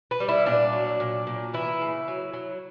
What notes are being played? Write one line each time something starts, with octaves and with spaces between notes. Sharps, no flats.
B4
G3
E4
A#2 D4
F#3
A#2
A#2
E3 E4
C#3
F#3
F#3